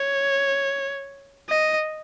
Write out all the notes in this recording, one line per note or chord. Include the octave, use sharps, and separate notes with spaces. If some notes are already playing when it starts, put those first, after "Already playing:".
Already playing: C#5
D#5